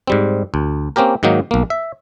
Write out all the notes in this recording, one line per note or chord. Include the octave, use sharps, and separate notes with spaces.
G#2 G3 C4
D2
A#3 C4 C#4 G4 A#4
G#2 D#3 F#3 A#3 D#4
B1 A#3
E5